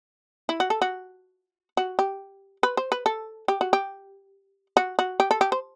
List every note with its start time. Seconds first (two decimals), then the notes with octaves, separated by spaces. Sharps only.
0.49 E4
0.60 F#4
0.70 A4
0.82 F#4
1.77 F#4
1.99 G4
2.63 B4
2.77 C5
2.92 B4
3.06 A4
3.48 G4
3.61 F#4
3.73 G4
4.77 F#4
4.99 F#4
5.20 G4
5.31 A4
5.41 G4
5.52 C5